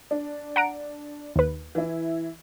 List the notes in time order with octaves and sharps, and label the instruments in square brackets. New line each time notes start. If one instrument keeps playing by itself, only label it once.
[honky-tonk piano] D4
[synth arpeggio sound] F#5 A#5 D7
D#2 B4
[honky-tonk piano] E3 E4